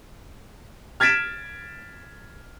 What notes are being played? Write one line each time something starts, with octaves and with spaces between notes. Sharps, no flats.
F6 G#6 A6 B6 D7 E7